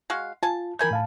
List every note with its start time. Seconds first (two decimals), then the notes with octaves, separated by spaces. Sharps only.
0.10 G#3 F#4 F5
0.43 F4 G#5 A5
0.79 D#3 E3 A#4 G#5 B5 G6
0.91 A2 F5 A5